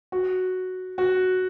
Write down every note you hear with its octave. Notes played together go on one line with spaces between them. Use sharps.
F#4
F#4